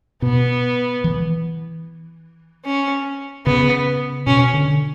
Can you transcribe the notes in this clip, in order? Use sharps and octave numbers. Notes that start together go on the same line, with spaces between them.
B2 B3
E3
C#4
C#3 B3
B2 C#4
D3